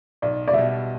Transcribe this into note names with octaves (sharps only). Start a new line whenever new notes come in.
B1 D5
D5
B2 G3 E5